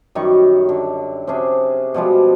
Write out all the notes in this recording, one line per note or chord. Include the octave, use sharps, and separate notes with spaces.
F#2 D#3 G3 C#6
D3
C3 C#4 D4 G#4
B2 F3 G3 G#3